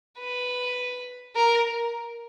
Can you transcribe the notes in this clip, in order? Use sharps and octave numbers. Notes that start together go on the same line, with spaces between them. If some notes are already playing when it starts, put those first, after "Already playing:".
B4
A#4